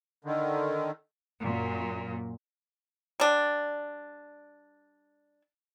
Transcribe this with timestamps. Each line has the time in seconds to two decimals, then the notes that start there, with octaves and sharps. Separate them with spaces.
0.25 D3 D#3
1.42 F#2 A#2
3.20 G3 D4